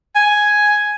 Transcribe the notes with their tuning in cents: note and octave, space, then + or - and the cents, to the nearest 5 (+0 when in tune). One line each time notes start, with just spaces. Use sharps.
G#5 +5